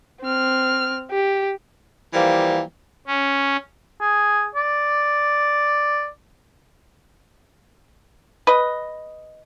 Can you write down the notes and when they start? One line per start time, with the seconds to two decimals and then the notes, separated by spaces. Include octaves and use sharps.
0.22 C4 F6
1.11 G4
2.13 E3 F3 G3 A#3
3.07 C#4
4.01 G#4
4.55 D5
8.47 B4 D#5